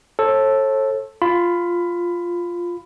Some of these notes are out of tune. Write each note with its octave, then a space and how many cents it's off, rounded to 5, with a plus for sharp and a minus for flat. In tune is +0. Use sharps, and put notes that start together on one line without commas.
A4 +0 C#5 -45
F4 +0 B5 +20